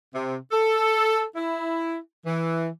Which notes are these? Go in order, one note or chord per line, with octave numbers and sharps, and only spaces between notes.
C3
A4
E4
E3